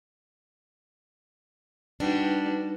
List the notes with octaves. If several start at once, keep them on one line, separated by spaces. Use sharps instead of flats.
G3 D4 D#4 F#4 B4